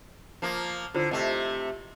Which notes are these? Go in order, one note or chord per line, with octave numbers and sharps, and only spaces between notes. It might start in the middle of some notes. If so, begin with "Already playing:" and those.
F3 A#3
D3 E4 F4 C5
C3 A3 D#5 E5 G5